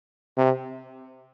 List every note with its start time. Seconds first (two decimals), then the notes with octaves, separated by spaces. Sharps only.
0.37 C3